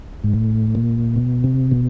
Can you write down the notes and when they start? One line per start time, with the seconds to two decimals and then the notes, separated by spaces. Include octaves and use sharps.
0.24 G#2
0.33 A2
0.75 A#2
1.16 B2
1.44 C3
1.71 B2